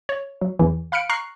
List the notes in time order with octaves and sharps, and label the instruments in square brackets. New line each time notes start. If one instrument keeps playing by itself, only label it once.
[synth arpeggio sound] C#5
F#3
E2 E3
F5 B5 F6 F#6 C#7 D7
A#5 C#6 F6 F#6 C7